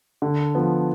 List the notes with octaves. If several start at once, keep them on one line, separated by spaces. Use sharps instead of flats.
D3
F3 B3